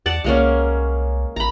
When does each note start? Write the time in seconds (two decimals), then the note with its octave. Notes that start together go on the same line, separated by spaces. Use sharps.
0.06 E2 D5 F#5 A5
0.24 C2 G#3 A#3 C#4
1.36 A1 A#5 B5